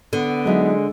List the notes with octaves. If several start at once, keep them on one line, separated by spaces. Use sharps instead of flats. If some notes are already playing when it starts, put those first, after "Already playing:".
D3 B3
F#3 G#3 D#4 E4